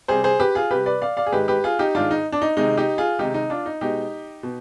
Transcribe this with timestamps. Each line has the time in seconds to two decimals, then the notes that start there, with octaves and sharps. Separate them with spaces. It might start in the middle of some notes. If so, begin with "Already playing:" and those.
0.08 C3 G3 G#4 C5
0.24 G#4 C5
0.40 G4 B4
0.55 F4 G#4
0.71 C3 G3 G4 B4
0.86 B4 D5
1.02 D5 F5
1.17 D5 F5
1.26 G#4
1.32 G#2 D#3 G#3 G4 B4
1.48 G4 B4
1.64 F4 G#4
1.79 D#4 G4
1.95 G#2 D#3 G#3 D4 F4
2.11 D#4
2.32 D4
2.42 D#4
2.57 C3 D#3 G#3 D#4
2.77 D#4 G4
2.98 F4 G#4
3.19 C3 D#3 G#3 D#4 G4
3.34 D#4
3.50 D4 F4
3.66 D#4
3.81 B2 G#3 D#4 G4
4.43 B2